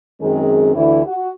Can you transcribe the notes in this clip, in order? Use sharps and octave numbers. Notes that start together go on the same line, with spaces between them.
F#2 D#3 G#3 C4 G#4
D2 D3 E3 E4
F#4